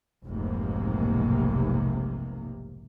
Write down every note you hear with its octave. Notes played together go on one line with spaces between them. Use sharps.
F1 B1 G#2 C3 A#3